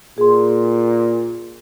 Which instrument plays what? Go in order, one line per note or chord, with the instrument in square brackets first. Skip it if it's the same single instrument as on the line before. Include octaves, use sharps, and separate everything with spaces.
[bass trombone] A#2 [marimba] G#4 C6